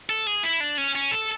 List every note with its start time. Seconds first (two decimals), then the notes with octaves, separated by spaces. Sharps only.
0.09 A4
0.27 G#4
0.43 E4
0.60 D4
0.78 C#4
0.95 C#4
1.11 A4